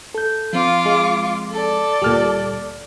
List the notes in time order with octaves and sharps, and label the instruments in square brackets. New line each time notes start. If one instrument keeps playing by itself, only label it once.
[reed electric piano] A4 G6
[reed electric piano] F3 C4 [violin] F4 D6
[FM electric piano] G#3
[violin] A4 D5
[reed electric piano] D2 F6 [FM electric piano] A#2 G3